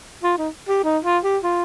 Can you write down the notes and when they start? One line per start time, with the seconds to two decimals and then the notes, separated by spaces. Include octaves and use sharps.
0.23 F4
0.38 D#4
0.69 G4
0.84 D#4
1.04 F4
1.24 G4
1.43 F4